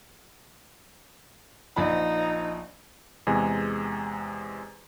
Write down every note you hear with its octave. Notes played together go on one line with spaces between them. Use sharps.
A#1 F3 D#4 B5
E2 C3 G#3 G#5